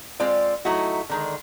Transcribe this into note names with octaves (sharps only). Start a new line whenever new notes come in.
G#3 C4 F4 D5
F#3 A3 D#4 E4 F#4
D3 D#3 G#3